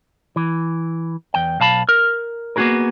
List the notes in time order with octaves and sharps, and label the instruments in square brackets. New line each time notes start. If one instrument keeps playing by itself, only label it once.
[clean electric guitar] E3
E2 G5
B1 F5 A5 B5
A#4
A#3 B3 C#4 F#4 G#4 A#4